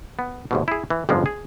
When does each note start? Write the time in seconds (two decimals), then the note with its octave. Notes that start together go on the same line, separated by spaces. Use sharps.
0.19 B3
0.51 D#2 G#2 B2
0.68 E4 G#4
0.90 E3
1.09 G1 F2 G#2 F3 G3 G#3
1.26 G#4